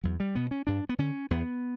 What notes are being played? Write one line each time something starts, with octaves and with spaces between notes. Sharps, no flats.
E2 F#3
G3
B2 B3
C#4
G2 D4
B3
D3 C#4
E2 B3